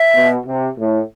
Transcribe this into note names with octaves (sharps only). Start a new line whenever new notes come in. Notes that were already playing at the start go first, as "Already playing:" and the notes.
Already playing: E5
B2
C3
A2